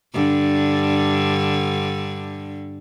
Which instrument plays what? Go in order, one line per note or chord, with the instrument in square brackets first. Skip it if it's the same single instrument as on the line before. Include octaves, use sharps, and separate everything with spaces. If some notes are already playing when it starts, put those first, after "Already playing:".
[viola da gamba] G2 D3